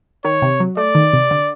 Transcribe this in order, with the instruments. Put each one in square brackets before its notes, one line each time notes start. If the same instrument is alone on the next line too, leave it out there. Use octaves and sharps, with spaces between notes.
[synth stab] D#3 [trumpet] C#5
[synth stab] C3
F#3
[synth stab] A3 [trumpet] D5
[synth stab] D#3
C3
D3